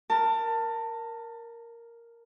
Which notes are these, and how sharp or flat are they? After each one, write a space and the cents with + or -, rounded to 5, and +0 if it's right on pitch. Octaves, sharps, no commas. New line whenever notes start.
A#4 +0 A5 +25